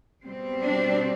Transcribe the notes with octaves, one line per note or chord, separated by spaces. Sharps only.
B2 G3 C4
D4